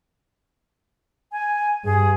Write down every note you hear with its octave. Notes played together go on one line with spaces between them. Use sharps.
G#5
G2 G#4